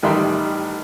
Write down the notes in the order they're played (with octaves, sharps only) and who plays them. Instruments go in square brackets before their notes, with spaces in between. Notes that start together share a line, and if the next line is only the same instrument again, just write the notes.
[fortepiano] A1 D#3 G3 E5 G5 C6